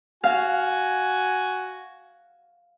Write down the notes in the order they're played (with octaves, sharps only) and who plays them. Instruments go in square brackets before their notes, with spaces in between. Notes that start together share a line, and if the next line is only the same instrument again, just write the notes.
[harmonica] F#4 G#5 [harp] F5